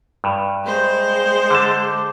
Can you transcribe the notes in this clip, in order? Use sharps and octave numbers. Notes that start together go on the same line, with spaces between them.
G2
G#3 C5
D3 A5